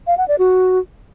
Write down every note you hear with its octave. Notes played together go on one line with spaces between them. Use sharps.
F5
F#5
D5
F#4